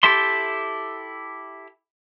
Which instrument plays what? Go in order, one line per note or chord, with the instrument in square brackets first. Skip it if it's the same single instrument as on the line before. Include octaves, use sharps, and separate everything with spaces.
[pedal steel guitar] E4 G4 A4 E5 C6